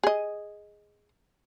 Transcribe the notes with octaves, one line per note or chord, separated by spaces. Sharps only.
G#4 D#5